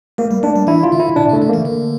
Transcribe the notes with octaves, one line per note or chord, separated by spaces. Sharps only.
A3 A#3
G3
A3 D4
G3
E3 E4
F4
D3
E4
A#2 D4
C#3
A3
D3
E3 A#3
D3